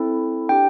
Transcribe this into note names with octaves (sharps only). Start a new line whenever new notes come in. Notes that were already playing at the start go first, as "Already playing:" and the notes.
Already playing: C4 E4 A4
D4 G4 G5